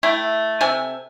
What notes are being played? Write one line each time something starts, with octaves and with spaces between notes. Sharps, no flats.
A3 E4 G5
C3 A4 G#5